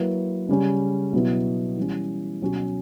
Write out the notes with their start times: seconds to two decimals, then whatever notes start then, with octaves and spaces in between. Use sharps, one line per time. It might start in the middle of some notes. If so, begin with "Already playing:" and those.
Already playing: F#3 A#3 E4 B4
0.49 C#3 G3 C#4
1.13 B2 F#3 B3 E4
1.77 E3 G3 C#4
2.42 B2 F#3 C#4 F#4